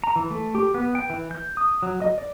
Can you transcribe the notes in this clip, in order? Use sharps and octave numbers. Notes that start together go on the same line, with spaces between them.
A#5
E3
A3
G4
B3
G5
E3
G6
D#6
F#3
D#5
D5